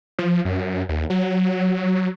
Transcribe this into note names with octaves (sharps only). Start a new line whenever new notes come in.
F3
F#2
D#2
F#3